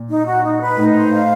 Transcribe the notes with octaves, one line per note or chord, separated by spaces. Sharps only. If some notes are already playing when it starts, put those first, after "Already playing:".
Already playing: A#2
D#4
F#4
D#4
B4
A2 D#4
C5
F5